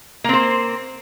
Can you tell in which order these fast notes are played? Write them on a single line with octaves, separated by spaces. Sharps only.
A#3 C4 C5